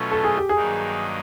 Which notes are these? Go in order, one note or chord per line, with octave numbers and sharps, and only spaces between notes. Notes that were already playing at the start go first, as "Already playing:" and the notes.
Already playing: B2 F#3 A3 C#4 F4
A4
G#4
G4
G#4
G2 D#3 F#3 A#3 D#4